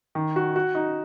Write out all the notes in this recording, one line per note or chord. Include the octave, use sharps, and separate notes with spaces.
D#3
F#4
F#4
D#4